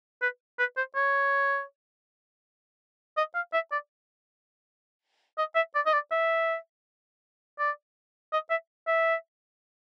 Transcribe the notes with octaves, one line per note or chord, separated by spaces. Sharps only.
B4
B4
C5
C#5
D#5
F5
E5
D5
D#5
E5
D5
D#5
D5
E5
D5
D#5
E5
E5